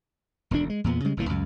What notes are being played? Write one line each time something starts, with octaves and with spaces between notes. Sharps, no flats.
E1 D2 G#3 D4
G#3
E2 A#2 B3
C#3 G3 G#3
F#1 A2 E3 A#3
C#2 F#2